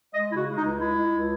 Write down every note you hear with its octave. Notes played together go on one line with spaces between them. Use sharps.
G#3 D#5
C#3 E4
F#4
G#3
D#4
C#2
G#3 E4
G#3
C#2